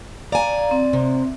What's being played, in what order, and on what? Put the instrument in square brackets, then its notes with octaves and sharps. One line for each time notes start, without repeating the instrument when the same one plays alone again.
[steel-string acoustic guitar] D5 G#5 [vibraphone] F5 A#5
[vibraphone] C4
[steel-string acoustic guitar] C3